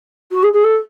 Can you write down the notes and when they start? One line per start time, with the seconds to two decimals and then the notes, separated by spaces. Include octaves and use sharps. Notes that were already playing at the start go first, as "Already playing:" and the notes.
0.31 F#4
0.43 G#4
0.53 G#4
0.64 A4